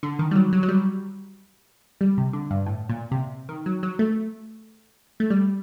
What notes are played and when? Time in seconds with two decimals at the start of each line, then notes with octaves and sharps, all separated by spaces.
0.03 D3
0.19 D#3
0.31 G3
0.35 F#3
0.53 F#3
0.63 F#3
0.69 G3
2.01 G3
2.18 C3
2.33 D3
2.51 G2
2.66 A2
2.89 A#2
3.11 C3
3.49 D#3
3.66 F#3
3.83 F#3
3.99 A3
5.20 A3
5.30 G3